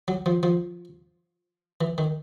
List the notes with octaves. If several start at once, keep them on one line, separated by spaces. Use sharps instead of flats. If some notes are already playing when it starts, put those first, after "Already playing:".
F#3
F3
F3
E3
D#3